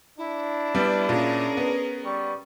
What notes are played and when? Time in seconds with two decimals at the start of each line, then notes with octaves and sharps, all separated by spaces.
0.18 D4 E4
0.75 G3 B3 D5
1.09 A#2 C#4 G#4 A#4
1.57 B3
2.05 G3 C#6